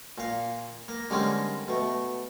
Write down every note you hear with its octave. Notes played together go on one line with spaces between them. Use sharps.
A#2 F5
A#3
D3 G3 G#3 A#3 C4 C#4
B2 A3